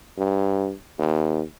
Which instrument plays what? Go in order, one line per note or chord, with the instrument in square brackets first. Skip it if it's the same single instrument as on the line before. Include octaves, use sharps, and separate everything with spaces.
[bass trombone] G2
D#2